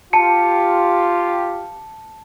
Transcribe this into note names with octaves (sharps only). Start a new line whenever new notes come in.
F4 G4 A5 C#7